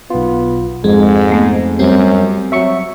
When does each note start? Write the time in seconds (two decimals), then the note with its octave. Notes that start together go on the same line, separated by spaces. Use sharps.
0.10 B1 B3 F4
0.84 F2 G#2 G#3
1.32 A3 B3 G#4
1.79 F#2 G3 C4
2.52 F#3 E5 C#6 C#7